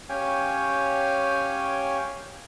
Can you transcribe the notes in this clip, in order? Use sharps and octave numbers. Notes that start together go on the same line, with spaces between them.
C#4 G4 C#5 F5 G5 G#5